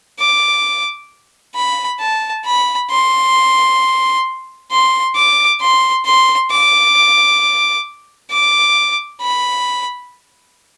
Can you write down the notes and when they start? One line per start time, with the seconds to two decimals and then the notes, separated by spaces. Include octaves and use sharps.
0.20 D6
1.55 B5
2.00 A5
2.45 B5
2.90 C6
4.71 C6
5.16 D6
5.61 C6
6.05 C6
6.51 D6
8.31 D6
9.21 B5